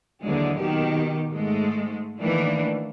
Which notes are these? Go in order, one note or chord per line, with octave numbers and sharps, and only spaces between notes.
D#2 D3 E3 F#3 G#3
B2 D#3 G4
G#2 G#3 A3
D#3 E3 A3 A#3 D4